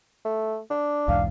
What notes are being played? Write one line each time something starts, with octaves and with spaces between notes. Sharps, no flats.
A3
D4
B1 E2 G#2 F5